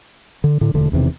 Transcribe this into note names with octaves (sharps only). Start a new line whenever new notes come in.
D3
A2 D3
E1 D2 D3 A3
E1 E2 C3 D#3